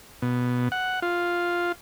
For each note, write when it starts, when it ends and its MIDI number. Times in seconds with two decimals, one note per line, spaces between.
0.22 0.69 47
0.72 1.00 78
1.02 1.72 65